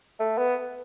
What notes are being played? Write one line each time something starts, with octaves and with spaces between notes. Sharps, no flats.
A3
B3